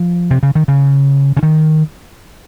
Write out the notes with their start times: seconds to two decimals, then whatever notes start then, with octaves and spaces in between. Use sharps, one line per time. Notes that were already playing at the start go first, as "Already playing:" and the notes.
Already playing: F3
0.31 C3
0.43 C#3
0.55 D#3
0.68 C#3
1.37 C#3
1.43 D#3